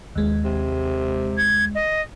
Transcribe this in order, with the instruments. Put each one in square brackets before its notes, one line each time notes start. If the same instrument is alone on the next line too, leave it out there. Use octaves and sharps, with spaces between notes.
[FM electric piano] D#2 G#3
[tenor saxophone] C3
[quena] G#6
D#5